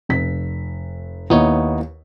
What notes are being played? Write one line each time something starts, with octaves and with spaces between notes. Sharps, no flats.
F1 B6
D#2 B3 D#4 E4 C#5